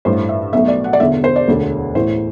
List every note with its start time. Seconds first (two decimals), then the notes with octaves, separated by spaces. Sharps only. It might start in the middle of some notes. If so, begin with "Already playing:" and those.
0.05 A1 G2 E3 A3 C5
0.29 E5
0.53 B1 B2 F#3 A3 E5
0.68 D5
0.84 F#5
0.93 D5
1.00 E1 E2 D3 E5
1.24 C5
1.36 D5
1.48 E1 D2 D3
1.95 A1 A2 E3 A3 C5